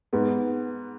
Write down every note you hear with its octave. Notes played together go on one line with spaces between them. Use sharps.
G#2 B3